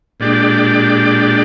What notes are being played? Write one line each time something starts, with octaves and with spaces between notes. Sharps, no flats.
A#2 G#3 D4 G4 D5